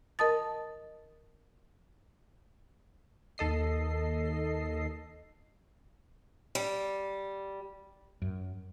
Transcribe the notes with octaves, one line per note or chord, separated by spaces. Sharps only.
A#4 D#5 A5 D#6 A6
D#2 A4 D#5 C7
G3
F#2